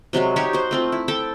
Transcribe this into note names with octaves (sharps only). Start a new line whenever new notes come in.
C3 F#3 G#3 F#4
D#4 F#4 G4 C#5
F#4 C5
A3 C4 F4
E4
A4 G5 A5